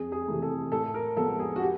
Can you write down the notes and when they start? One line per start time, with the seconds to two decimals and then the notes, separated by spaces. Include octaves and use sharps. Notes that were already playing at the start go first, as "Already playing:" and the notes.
Already playing: F2 G#4
0.12 G#4
0.27 C3 E3 A3
0.42 A4
0.72 A2 A4
0.94 A#4
1.16 F3 G#3 B3 A4
1.39 G#4
1.56 F#4
1.61 G4